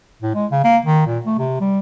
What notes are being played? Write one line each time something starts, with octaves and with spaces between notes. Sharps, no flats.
A2
G#3
C#3
A#3
D#3
A#2
A3
C3
G3